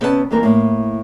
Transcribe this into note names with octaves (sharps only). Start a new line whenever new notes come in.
C3 B3 C#4 B4 D#5 A5
G2 D#3 E3 A#3 C4 A#4
A2 A#3